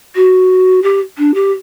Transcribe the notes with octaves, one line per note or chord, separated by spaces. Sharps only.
F#4
G4
D4
G4